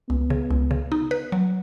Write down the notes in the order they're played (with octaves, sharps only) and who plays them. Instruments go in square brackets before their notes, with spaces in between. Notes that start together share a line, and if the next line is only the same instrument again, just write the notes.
[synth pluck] C#2 [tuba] B3
[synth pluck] C#3
C#2
C#3
D#4
B4
F#3